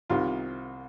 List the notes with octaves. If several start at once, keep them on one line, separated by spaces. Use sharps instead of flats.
C2 C3 D#3 F4